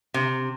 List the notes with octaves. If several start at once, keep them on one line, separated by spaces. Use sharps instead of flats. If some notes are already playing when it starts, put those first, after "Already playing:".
C3